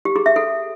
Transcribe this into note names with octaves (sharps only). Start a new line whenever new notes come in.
G4
G#4
E5
A4